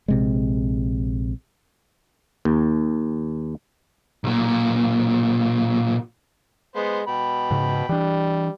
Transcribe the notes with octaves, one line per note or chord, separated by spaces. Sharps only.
A#1 C3 G#3
D#2
B1 A#2
G#3 B3 C5
B2 G5 B5
G#2 C#3
E3 G3 D4